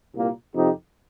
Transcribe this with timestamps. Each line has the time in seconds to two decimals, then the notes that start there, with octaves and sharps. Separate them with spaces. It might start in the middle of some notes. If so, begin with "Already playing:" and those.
0.13 C2 A#2 A#3
0.55 F2 C3 F3 D#4 G4